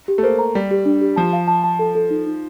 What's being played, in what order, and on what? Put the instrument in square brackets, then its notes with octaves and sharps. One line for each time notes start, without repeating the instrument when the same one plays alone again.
[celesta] G4
[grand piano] A3
[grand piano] A#3 [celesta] C5
[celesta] A#5
[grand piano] G3 [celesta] G4
[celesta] G4
D4
G4
[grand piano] F3 [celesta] A5
[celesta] F5
A5
A5
A4
A4
D#4
D#4